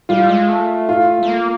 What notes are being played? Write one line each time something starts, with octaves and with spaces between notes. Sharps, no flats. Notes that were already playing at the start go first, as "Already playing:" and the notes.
G3 F4
G#3
A3
F4
A3
A#3